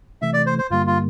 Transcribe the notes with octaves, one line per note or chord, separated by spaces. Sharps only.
C3 E3 A3 E5
D5
C5
C5
G2 D3 G3 A#3 F4
F4